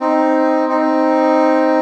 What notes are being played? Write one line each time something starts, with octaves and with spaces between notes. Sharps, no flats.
C4 D#4
C4 D#4